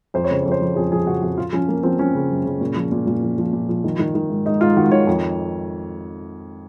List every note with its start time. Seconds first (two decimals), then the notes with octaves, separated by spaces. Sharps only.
0.14 F2 C5
0.24 C#5
0.31 C#3 C5
0.43 F2 C#5
0.52 C5
0.61 F3
0.76 F2 G#4
0.92 F3 G#4
1.07 C#3 F#4
1.22 F2 F#4
1.37 F3 F4
1.53 F3 C#4
1.69 F3 A#3
1.83 F3 C4
1.99 F3 C#4
2.15 C#3
2.31 F#2
2.46 C#3
2.61 A#2
2.76 F3
2.91 A#2
3.07 A#2
3.22 F3
3.38 F3
3.53 A#2
3.69 F3
3.84 D#3
3.99 D#3
4.15 D#3
4.30 G#2
4.46 G#2 D#4
4.61 G#2 F4
4.77 D#3 F#4
4.92 D#3 C#5
5.07 F2